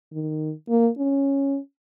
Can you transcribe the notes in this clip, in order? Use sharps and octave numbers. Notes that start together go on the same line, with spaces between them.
D#3
A#3
C#4